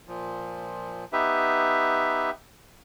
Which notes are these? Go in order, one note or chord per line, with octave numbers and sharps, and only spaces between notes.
A#2 F3
B3 D#4 G4 B4 E5